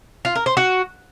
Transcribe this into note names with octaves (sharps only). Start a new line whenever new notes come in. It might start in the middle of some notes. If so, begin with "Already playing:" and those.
F4
A#4
C5
F#4